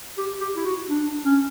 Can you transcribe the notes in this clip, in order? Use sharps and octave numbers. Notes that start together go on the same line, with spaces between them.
G4
G4
E4
F#4
D4
C#4